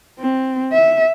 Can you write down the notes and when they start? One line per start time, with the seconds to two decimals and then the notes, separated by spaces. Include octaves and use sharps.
0.19 C4
0.73 E5